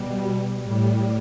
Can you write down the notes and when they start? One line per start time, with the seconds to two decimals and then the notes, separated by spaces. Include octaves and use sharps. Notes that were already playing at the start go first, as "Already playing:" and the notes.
Already playing: B2 G3
0.59 A2 G3